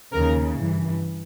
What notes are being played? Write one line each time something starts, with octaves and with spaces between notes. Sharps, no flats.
D#2 C#3 F3 A#4
G2 E3